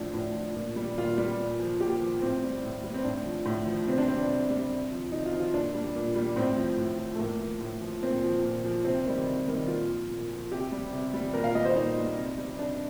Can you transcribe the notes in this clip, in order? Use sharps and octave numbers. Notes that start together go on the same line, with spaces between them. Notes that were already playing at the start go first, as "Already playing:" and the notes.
Already playing: A2 F3 D4
A2 D4
F3
A#2
G3
A#2 F4
G3
A#2
F3
A#2 G4
F3
A2 C4
G3
A2
G3
C4
A2 D4
F3
A2
F3
C3 C4
D4
G3 C4
C3
G3
C3
F3
C3 D#4
F4
F3
F4
A#2 D4
G3
A#2
G3
A2 C4
F3
A2
F3
A3
A2 A#3
F3
A2
F3
A#2 C4
F3
A#2
F3
C3 C4
D#3 G3
C3
D#3 G3
A#2 F4
F3
A#2
F3
C3 G4
G3
C3
G3
A#2 A#4
F5
G3 D#5
C5
A#2 D#4
G3
C3
G3
C3 D4